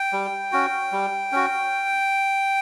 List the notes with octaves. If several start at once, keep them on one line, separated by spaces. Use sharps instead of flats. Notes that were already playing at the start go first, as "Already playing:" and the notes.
Already playing: G5
G3
C#4 F#4
G3
C#4 F#4